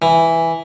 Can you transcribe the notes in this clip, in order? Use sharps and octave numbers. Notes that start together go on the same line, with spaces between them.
E3